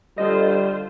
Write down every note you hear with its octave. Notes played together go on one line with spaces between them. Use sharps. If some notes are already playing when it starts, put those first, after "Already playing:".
D3 G3 F4 C5 D#5